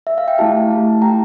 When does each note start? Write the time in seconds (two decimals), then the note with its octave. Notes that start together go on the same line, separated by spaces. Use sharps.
0.07 E5
0.18 F5
0.28 G5
0.38 A3 E4 G4 F5 A5
0.70 A3 E4 G4
1.02 A3 E4 G4 G5 A#5